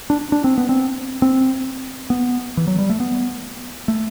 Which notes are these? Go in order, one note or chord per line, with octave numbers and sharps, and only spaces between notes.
D4
D4
C4
B3
C4
C4
B3
E3
F#3
G3
A3
B3
A3